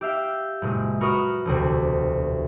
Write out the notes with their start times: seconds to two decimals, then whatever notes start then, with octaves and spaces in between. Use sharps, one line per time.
0.01 G4 E5 F5 G5
0.62 F#1 A#2 G#3
1.01 F#4 A#4 B4 C#6 D#6 F6
1.45 E1 D2 C3